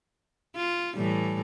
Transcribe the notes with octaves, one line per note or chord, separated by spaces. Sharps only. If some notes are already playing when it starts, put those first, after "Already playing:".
F4
A2 E3 G3